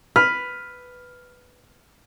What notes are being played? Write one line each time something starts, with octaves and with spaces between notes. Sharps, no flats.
B4 F6